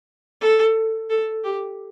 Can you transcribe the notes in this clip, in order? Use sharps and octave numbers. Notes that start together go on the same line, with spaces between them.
A4
A4
G4